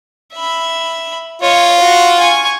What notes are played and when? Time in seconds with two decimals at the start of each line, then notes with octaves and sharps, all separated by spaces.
0.34 E5 B5
1.42 F4 C#5 D#5
1.80 F#4
2.19 G#5 C#6